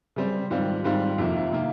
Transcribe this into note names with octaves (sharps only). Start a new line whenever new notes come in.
C#3 G3 C4
G#2 D#3 G3 C4 F4
G#2 D#3 G3 C4 F4
F2 C3 D#3 A#3 F4
C3 D#3 A#3 F4